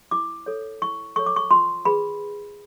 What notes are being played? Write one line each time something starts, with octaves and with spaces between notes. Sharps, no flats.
E4 D6
A4 C#5
E4 C#6
A4 C#5 C#6
D6
C#6
F4 C6
G#4 B4 B5